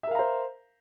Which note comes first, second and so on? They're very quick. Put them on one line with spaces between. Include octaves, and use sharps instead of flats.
E5 A#4 F5 A#5 C5